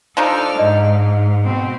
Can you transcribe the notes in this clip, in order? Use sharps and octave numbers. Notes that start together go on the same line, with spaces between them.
F3 D4 D#4 A4 D5 F6
G#2 D#5
B2 C4